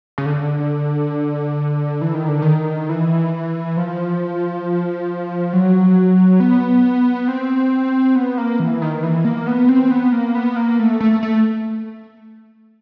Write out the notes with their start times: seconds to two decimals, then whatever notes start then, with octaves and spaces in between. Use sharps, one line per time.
0.18 C#3
0.26 D3
2.01 E3
2.14 D#3
2.28 D3
2.42 D#3
2.89 E3
3.77 F3
5.53 F#3
6.40 B3
7.28 C4
8.15 B3
8.38 A#3
8.59 E3
8.82 D#3
9.03 E3
9.25 A#3
9.47 B3
9.69 C4
9.91 B3
10.12 A#3
10.35 B3
10.56 A#3
10.79 A3
11.00 A3
11.23 A3